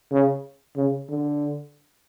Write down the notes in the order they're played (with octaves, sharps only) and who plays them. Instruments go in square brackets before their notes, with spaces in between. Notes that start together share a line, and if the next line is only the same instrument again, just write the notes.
[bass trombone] C#3
C#3
D3